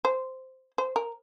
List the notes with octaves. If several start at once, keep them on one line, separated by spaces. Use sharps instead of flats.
C5
C5
A#4